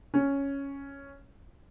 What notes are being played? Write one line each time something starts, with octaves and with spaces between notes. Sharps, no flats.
C#4